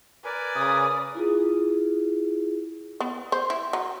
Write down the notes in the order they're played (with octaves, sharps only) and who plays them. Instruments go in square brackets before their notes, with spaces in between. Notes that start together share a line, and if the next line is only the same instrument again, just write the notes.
[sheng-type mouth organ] A#4 B4 G#5 [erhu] D5
[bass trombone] C#3 [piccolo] D#6
[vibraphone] E4 F4 G#4
[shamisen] B3
C5
E4
F#3